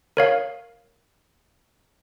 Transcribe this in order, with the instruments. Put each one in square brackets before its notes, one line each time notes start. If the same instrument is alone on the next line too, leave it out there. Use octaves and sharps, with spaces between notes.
[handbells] A#4 C#5 F5